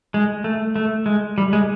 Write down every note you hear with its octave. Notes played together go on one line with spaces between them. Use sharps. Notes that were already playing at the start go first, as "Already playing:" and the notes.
G#3
A3
A3
G#3
G3
G#3